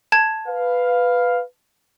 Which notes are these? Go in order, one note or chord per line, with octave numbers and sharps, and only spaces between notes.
A5 G#6
B4 F5